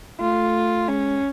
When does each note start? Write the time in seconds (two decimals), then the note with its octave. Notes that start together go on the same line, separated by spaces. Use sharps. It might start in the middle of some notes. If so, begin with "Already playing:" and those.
0.20 A3 F4
0.88 G#3 C#4